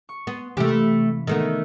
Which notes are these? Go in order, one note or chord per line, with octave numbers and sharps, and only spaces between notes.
C#6
B3 C6
C3 E3 A3 A#3 G4
B5
D#3 A3 B3